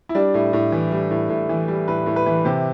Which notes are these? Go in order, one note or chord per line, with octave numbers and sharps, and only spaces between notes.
E4
G3 D4
A2
A2
E3
G3
A2
A2
E3
G3
A2 B4
A2
B4
E3
C3 G4